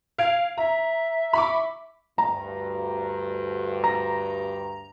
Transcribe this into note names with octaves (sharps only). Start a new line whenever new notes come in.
F5 G#6 D7
E5 A#5
B5 C#6 D6
D2 G2 A#5
A#5 A#6